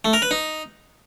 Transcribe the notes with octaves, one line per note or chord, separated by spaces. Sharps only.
A3
A#4
B4
D#4